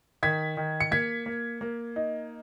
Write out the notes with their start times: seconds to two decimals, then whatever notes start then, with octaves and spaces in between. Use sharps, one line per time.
0.23 D#3 G#6 B6
0.57 D#3
0.80 C#7
0.91 A#3 G#6 B6
1.26 A#3
1.61 A#3
1.96 D#4